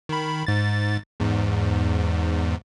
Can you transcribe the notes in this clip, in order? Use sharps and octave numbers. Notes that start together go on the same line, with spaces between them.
D#3 B5
G#2 A6
E2 G#2